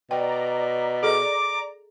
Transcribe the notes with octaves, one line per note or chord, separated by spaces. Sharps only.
B2 D5 G5 A#5
G#4 A4 D#5 D6